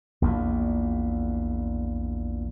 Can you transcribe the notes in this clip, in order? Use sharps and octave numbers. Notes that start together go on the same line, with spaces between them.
A#1 E2 A#2